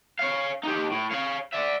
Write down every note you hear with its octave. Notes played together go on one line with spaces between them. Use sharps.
C#5 F5
D#4 G4
A2
C#5 F5
D5 E5